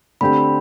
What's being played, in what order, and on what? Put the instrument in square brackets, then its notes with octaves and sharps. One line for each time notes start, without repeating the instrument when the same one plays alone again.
[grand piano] D3 A3 C4 G4 [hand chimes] B5